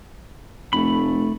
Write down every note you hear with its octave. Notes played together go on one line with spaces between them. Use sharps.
F1 A3 B5